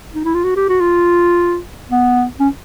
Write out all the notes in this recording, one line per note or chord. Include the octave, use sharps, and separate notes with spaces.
D#4
E4
F4
F#4
G4
F#4
F4
B3
C#4